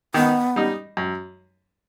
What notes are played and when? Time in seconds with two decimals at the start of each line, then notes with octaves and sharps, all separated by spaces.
0.14 D#3 B3
0.56 G3 D#4
0.97 F#2